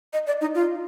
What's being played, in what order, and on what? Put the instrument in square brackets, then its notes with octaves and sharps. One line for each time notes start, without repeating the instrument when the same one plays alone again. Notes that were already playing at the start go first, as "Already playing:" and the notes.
[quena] D#5
D5
D#4
F4